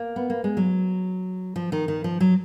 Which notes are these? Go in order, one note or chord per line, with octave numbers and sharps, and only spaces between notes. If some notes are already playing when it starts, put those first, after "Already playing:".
Already playing: A#3
B3
A#3
G#3
F#3
F3
D#3
D#3
F3
F#3